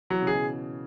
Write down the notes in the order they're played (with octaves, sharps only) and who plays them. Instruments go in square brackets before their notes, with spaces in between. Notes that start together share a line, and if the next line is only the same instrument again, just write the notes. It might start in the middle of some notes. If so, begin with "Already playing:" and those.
[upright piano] E3 [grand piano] F#3
[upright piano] C#3
[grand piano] G#4
[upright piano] B2